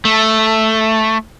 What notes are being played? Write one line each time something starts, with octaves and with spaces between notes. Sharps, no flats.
A3